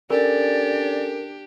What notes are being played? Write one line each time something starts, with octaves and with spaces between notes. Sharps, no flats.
C#4 D4 G4 A4 A#4 D5 G#5